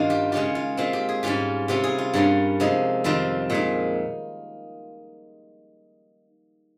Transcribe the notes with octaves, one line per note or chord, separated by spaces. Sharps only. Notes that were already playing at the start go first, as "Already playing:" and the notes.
Already playing: G2 D#3 A#3 C#4 D#4 F4 D#5 F5
G4
C#3 G#3 C#4 F4 G4
F4
A#2 G#3 C4 F4
G4
G#4
G#2 G3 C#4 F4 G4
C3 G3 C#4 F4 G4
G#4
F4
G2 G3 A#3 C#4
C3 F3 G#3 D#4
F2 D#3 G3 C4 F4
A#2 G#3 D#4